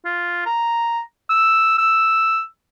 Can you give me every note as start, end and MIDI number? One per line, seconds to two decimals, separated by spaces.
0.05 0.45 65
0.46 1.00 82
1.30 1.76 88
1.78 2.41 88